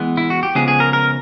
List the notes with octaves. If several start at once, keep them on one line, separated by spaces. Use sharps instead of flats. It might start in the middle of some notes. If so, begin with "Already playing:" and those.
Already playing: E3 G#3 B3
E4
F#4
G4
C#3 F3 G#3 B3 G#4
G#4
A#4
A#4